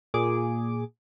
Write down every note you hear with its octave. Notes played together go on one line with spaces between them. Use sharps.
A#2 G#4 D6